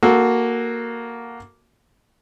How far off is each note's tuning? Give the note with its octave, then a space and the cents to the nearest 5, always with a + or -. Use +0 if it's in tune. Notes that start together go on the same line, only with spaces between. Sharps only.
A#3 +0 F#4 +0 A4 -15